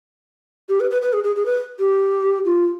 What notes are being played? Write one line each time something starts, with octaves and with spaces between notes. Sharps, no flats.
G4
B4
B4
B4
G#4
G#4
G#4
B4
G4
F4